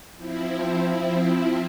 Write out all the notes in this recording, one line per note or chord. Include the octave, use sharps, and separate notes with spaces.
F3 C4 E4